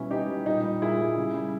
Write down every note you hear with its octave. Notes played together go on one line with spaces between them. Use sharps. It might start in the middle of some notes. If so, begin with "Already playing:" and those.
Already playing: B2 G3 C#4 E4
B2 D#4 G4
G3
A#2 D#4 G4
G3
A#2 E4 G#4
G3
C#3
G3